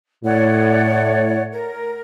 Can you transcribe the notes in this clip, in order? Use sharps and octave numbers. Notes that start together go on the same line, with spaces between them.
A2 C#5 D5 F#5
A#4